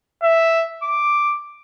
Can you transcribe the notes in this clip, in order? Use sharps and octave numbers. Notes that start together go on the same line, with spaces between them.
E5
D6